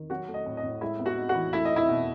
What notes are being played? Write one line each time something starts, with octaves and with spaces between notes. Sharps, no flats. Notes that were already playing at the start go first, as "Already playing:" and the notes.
Already playing: D#3
F#3 F#4 F#5
A3
D#5
A2
D#5
A2
G#3 E4 E5
B3
F#4 F#5
D#4
F#4 F#5
E3
A3 E4 E5
D#5
D#4
E4 E5
B2